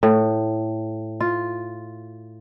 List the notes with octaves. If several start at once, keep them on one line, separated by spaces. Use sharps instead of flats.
A2
F4